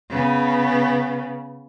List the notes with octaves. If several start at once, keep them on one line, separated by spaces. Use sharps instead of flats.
C#3 B3